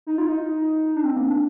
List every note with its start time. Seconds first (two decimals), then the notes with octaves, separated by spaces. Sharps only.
0.07 D#4
0.18 F4
0.29 D#4
0.96 D4
1.04 C4
1.16 A#3
1.28 D4